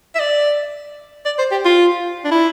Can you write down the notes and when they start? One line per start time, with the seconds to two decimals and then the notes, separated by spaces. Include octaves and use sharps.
0.15 E5
0.19 D5
1.25 D5
1.38 C5
1.51 G4
1.65 F4
2.25 D4
2.31 E4